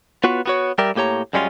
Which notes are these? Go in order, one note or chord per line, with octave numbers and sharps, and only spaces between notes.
B3 F4 F#4 B4 C#5
B3 F#4 C#5
G3 G4 A#4 D5 E5
A2 A#3 G4 C#5 A#5
F#2 G3 G#3 C#4 F4